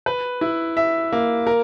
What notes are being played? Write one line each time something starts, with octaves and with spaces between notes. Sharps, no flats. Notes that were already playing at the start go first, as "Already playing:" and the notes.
B4
E4
E5
A#3
A#4